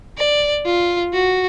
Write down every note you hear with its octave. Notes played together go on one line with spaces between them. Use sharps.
D5
F4
F#4